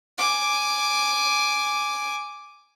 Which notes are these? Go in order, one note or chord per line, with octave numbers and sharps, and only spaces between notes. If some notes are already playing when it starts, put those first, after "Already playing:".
G#5 D6